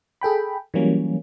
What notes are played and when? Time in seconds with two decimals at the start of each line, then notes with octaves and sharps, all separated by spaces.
0.21 G#4 A4 G5 B5
0.74 E3 F#3 G3 A#3 C#4